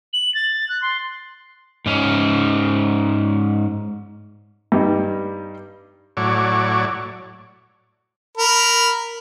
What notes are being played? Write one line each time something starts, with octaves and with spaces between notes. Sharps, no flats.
F#7
A6
F#6
C6
G#2 C#4
G2 G3 D#4
A2 F#3 C#5 D5
A#4 B5